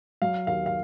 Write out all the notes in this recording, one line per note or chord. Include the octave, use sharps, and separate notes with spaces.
F#3 F5
D#2 F5
F5